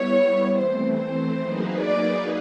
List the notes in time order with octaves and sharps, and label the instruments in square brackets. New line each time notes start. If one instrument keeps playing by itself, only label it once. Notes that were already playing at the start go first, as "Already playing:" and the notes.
Already playing: [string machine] G3 B3 E4 [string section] C#5
[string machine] E3 A3 C4 [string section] C5
[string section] C5
[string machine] F#3 A#3 D#4 G#4 B4
[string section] D5